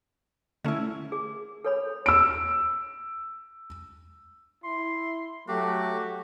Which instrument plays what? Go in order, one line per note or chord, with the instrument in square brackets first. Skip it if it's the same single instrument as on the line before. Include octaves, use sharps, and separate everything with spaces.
[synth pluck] D3 A3 [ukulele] C#4 E4
[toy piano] G#4
A4 C#5 B5
[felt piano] E6 D7
[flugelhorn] E4 [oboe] C6
[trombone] F#3 [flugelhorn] A3 [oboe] F#4 [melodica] G4